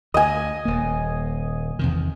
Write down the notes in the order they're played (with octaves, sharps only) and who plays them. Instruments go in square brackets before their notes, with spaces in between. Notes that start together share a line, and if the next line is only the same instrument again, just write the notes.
[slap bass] D2 [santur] D#5 G#5
[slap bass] D#1 A#3
E2 C3 D#3